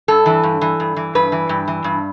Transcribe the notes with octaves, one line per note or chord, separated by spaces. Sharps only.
G2 A4
E3
G2
E3
G2
E3
G2 B4
E3
G2
E3
G2